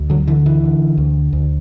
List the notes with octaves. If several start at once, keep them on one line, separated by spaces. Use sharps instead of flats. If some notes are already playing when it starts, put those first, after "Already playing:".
Already playing: D2
D3 F#3
D3 E3
E3
D3
D2
D2